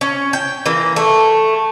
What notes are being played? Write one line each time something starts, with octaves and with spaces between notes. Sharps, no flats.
C#4
G5
E3 A#3
A3